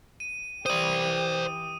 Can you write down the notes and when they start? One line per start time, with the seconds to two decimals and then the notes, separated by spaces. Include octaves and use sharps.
0.20 D#7
0.66 E3 G4 C5 D5 D#6 D#7